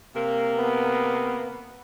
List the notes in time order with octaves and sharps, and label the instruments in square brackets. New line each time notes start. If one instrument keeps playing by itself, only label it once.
[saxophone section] C3 A#3
[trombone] B3